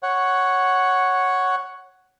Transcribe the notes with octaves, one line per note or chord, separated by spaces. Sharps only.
C#5 F#5